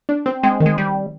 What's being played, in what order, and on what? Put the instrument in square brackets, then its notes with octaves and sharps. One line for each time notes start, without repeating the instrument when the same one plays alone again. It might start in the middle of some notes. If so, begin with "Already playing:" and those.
[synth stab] D4
C4
[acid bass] G#3 [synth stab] C4
[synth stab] D#3
[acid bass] G#3
G3